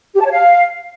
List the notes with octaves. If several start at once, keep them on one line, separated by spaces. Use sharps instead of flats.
G4
A5
C#5
F5